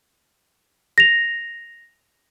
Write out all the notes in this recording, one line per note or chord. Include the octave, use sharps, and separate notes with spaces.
A#6 F7